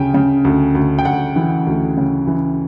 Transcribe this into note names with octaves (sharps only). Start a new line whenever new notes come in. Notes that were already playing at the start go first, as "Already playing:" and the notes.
Already playing: D2 C#3 G5 G#5
C#3
D2
D2
G5
D2 F#5
E3
D2
C#3
E3